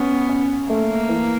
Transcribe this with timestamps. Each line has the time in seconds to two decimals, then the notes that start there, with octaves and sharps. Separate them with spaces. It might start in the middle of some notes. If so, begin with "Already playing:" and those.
Already playing: B3 C#4
0.29 C#4
0.70 A3 A#3
1.09 E3